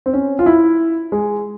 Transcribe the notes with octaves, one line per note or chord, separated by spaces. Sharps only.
C4
C#4
F4
E4
G#3